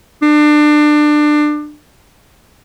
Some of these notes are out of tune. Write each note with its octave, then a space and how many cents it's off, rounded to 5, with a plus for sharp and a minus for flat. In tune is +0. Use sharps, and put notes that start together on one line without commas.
D4 +25